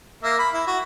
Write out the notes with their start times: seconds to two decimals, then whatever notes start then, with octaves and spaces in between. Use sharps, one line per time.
0.23 A#3 E5
0.39 B5
0.53 E4
0.67 F#4